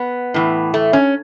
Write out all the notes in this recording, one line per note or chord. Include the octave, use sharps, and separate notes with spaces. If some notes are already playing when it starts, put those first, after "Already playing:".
Already playing: B3
A2 E3
A3
C#4